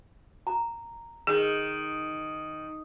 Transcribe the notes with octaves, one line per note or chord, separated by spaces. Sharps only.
A#5
D#3 G#4